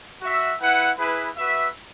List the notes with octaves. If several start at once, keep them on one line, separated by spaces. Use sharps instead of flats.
F#4 E5
E4 B4 F#5
E4 G#4 B4
F#4 B4 E5